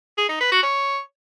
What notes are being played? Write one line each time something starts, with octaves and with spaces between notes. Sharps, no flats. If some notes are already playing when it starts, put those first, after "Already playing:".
G#4
D#4
B4
F#4
C#5